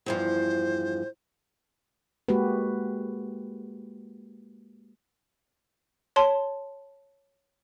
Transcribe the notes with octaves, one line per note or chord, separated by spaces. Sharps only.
E2 G2 F3 C5
G#3 A#3 F#4 G4 B4
C#5 A5 C6